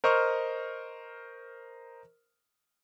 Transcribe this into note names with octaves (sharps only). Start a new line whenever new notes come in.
A#4 C5 D#5 C#6 F6